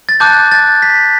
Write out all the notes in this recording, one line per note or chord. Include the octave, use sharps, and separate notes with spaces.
A6
A5 D6 F#6 G6
A6
B6